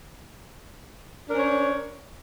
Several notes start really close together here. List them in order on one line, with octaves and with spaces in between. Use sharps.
D4 A#4 C#4 C5 C#5